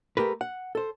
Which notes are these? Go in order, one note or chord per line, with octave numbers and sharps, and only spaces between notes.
A3 G4 A#4 B4
F#5
A4 C5